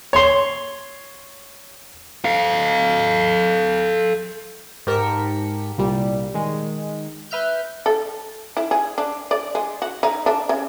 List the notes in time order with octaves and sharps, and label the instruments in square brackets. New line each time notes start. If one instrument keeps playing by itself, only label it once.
[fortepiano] C#5 C6
[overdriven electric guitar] A4 F5
[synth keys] G#2 G4 A#4 A5 B6 C#7
C2 A#2 G3
D#3 G#3
B4 E5 F6 G6
[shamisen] A4
E4
G#4
D4
D5
G#3
F#4
D#4
D4
C#3